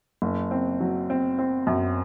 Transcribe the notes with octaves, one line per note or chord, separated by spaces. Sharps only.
F#1
C4
F#3
C4
C4
F#2